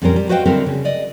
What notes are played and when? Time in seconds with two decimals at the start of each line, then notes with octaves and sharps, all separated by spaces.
0.02 F2 A#2 G3 C4 C#4 A#4
0.16 G3
0.29 F#4 B4 C5 D#5 F5 G5
0.46 D3 G3 C4 E4 A4 A#4
0.66 C#3
0.85 D5 D#5